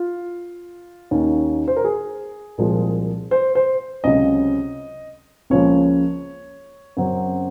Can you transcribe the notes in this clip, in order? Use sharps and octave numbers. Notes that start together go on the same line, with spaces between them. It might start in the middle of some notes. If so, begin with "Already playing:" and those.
Already playing: F4
D#2 D#3 A#3 C#4
C5
A#4
G#4
C2 A#2 F3 G#3
C5
C5
C#2 C3 F#3 C#4 D#5
C#2 C#3 F3 A#3 C#5
F#2 C#3 F#3 C4